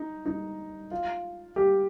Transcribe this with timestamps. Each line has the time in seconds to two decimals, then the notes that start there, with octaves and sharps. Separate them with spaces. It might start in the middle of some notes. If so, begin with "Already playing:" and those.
Already playing: D#4
0.26 D#4
0.91 F4
1.56 G4